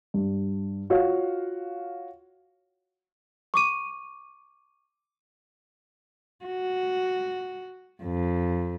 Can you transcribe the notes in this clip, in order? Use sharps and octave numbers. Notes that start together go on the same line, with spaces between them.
G2
F4 F#4 C#5 F5
C#6 D6 D#7
F#4
F2